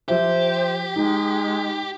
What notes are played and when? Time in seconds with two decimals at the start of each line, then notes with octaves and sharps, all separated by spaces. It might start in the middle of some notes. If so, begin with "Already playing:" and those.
0.08 F3 G4 C5 E5
0.96 G#3 D#4